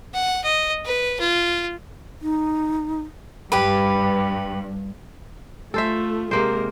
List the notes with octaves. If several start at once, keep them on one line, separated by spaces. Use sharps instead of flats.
F#5
D#5
B4
F4
D#4
G2 G4 B4
A3 F4 A4 C5 E5
C3 G#3 A#3 A#4 C5